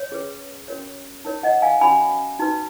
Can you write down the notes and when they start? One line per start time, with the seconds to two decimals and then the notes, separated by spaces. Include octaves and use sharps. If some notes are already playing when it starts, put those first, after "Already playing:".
Already playing: C#5
0.11 C#4 G#4 B4
0.68 C#4 F#4 A#4 C#5
1.24 D#4 A#4 C#5
1.43 D#5 F#5
1.62 F5 G#5
1.81 C#4 F#4 C#5 G#5 B5
2.39 D#4 F#4 B4